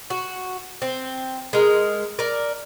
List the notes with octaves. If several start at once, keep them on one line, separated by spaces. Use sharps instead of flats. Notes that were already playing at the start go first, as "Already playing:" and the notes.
F#4
C4
G#3 A#4
A#4 D5